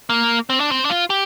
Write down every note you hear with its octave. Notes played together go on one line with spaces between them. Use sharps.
A#3
C4
D4
C4
D4
F4
G4